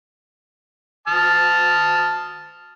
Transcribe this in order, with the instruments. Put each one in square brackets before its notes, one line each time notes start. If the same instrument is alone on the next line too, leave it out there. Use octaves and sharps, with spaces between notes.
[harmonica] A5 D#6 F6